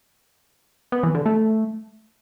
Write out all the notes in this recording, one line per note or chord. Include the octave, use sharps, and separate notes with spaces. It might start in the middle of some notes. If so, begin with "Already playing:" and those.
B3
E3
D3
A3